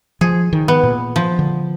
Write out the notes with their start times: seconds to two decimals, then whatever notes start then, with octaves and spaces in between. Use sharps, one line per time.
0.21 F3 G#4
0.53 D#3
0.68 B3
0.83 A#2
1.16 F3
1.39 D3